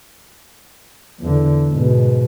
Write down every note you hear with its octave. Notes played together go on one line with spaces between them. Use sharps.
E2 D3
G#2 B2